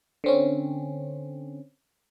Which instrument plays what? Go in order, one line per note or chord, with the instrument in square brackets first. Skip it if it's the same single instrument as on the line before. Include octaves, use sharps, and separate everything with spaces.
[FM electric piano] D3 C4 C#4